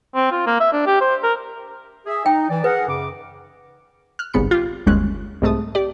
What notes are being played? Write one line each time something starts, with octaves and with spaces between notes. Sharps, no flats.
C4
F4
A#3
E5
D4
G4
C5
A#4
G#4 E5
D#4 G5
E3 D5
G#4 A#4 B4 F#5
F#2 C#3 D6
F6 F#6
G1 C2 G#2 B3 B5 C#7
F4 G4
G1 D#2 G#3 C#4 F#6
C2 G#2 A3 A5 D#6
G4 D5